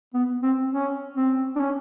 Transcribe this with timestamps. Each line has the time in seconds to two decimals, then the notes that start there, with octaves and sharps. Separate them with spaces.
0.14 B3
0.43 C4
0.73 C#4
1.16 C4
1.56 D4
1.60 C#4